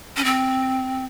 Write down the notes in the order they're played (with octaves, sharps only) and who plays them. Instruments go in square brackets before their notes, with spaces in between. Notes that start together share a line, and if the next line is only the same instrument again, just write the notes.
[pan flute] C#4
C4